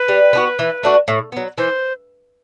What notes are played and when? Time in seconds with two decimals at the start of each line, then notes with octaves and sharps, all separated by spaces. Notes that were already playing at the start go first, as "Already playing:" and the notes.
Already playing: B4
0.08 G3
0.33 B3 D4 F#4
0.59 E3
0.83 A3 D4 F#4
1.08 A2
1.32 F#3 B3
1.58 E3 C5